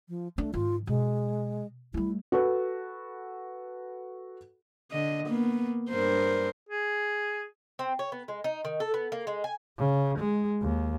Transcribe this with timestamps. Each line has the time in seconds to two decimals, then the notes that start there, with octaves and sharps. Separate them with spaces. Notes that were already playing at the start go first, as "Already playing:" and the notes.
0.09 F3
0.38 A3 D4
0.54 G#2 D#3 F4
0.87 B2 G#3
1.94 G3 A3 E4
2.32 F#4 A4 B4
4.91 D3 D#5
5.27 A#3 B3
5.90 G2 A#4 C5
6.69 G#4
7.79 C4
7.99 C#5
8.12 B3
8.28 G#3
8.44 D#4
8.65 D#3
8.80 A4
8.94 B3
9.12 A#3
9.27 G#3
9.44 G#5
9.78 C#3
10.19 G#3
10.62 D#2